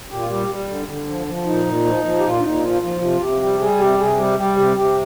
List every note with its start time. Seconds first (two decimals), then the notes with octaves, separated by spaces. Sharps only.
0.10 A#2 G4
0.20 F4
0.30 G3 G4
0.49 G3
0.68 D3
0.88 D3
1.07 F3
1.27 F3
1.46 A#2 D#4
1.65 A#2
1.85 F3
2.05 F3
2.19 G4
2.24 A#2 F4
2.39 D4
2.43 A#2 D#4
2.62 F3 F4
2.82 F3 F4
3.01 C3 F4
3.20 C3 G4
3.41 G3 G4
3.60 G3 G#4
3.79 C3 G4
3.98 C3 G#4
4.18 G3 G4
4.38 G3 G4
4.57 C3 G4
4.76 C3 G4